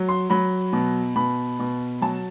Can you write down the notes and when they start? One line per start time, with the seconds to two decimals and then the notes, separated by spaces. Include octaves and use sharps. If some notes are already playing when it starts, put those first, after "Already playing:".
Already playing: F#3
0.09 C6
0.30 F#3 B5
0.73 B2
1.16 B2 B5
1.59 B2
2.02 F#3 A5